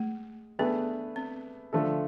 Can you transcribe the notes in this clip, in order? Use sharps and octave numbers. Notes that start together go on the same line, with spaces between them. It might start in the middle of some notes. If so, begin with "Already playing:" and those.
Already playing: G#3 A3
A3 B3 D4 G#4 B4
C4
D3 F3 A3 D4 A4